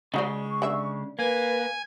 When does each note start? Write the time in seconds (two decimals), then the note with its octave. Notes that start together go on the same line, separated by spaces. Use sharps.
0.14 C#3 G#3 D#4 F#4 D5 C#6
0.62 D3 E5
1.19 A#3 B4 G#5